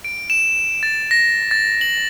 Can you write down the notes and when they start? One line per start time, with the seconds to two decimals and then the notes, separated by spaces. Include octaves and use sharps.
0.04 D7
0.30 E7
0.83 A6
1.11 A#6
1.51 A6
1.81 F#7